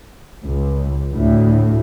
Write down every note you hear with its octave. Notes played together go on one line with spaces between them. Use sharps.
C#2
D2 A2